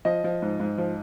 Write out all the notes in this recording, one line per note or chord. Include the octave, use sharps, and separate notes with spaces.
F3 D#5
F3
G#2
G#2
F3